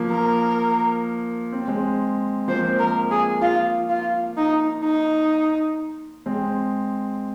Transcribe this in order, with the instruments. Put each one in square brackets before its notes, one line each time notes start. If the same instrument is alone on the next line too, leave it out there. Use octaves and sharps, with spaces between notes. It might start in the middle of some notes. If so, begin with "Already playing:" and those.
Already playing: [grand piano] F3 A#3
[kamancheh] A#4
[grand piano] C4
G#3 C4
[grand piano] F3 A#3 [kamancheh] C5
[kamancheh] A#4
G#4
F4
F4
D#4
D#4
[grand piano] G#3 C4